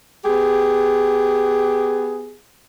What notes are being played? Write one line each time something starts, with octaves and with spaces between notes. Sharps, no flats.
B3 G4 G#4